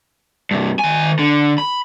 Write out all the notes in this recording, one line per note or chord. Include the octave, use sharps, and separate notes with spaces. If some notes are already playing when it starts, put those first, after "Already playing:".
G2 C3
D#3 G#5
D3
B5